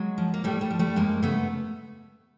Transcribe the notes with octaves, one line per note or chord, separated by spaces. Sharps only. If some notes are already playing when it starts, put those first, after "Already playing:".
Already playing: F#3 G#3
F3
A#3
A2 G3 A3
G3 A3
F3
G3 A3
F2 G#3 A#3
C#3 A3 B3